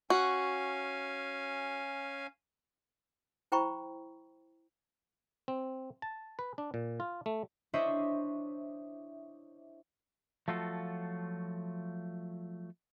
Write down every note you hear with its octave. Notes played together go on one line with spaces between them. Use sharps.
C#4 F#4 F5 G#5
E4 C5 G5 A#5 B5 C#6
C4
A5
B4
D4
A#2
F4
A3
D4 E4 C5 C#5 D#5 E5
F3 F#3 A3 F4 F#4 A4